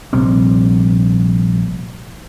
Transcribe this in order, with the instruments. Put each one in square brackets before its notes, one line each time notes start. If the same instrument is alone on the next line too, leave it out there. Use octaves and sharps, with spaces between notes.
[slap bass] A#1 C3 G3 C4